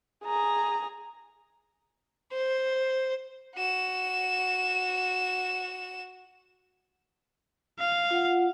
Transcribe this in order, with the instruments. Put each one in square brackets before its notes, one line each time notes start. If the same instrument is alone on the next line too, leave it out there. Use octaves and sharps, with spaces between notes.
[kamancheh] G#4 A#5
[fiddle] C5
[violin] F#4 E7
[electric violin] F5
[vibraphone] F4 F#5